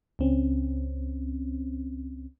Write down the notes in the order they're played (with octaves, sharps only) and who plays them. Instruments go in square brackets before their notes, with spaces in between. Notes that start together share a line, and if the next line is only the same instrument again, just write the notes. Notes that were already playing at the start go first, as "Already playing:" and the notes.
[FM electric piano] C#2 C4 C#4